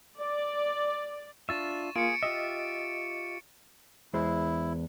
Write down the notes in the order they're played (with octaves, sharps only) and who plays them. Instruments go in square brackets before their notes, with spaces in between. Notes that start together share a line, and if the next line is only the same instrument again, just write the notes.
[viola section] D5
[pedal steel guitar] D4 F4 E5 [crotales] C#6 A6 E7
[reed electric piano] A#3 F4 [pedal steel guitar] G#4 [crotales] C#7 D7
[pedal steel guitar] F4 G4 E5 [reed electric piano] D#5
[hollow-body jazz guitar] E2 G#3 C5 [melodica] E4